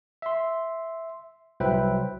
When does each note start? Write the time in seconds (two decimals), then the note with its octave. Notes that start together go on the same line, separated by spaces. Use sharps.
0.22 E5 C6
1.60 C2 F#3 B4 C5 E5 G5